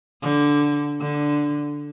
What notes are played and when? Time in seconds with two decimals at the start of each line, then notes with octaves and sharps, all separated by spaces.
0.22 D3
1.00 D3